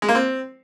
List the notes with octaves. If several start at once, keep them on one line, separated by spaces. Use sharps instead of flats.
G#3
A#3
C4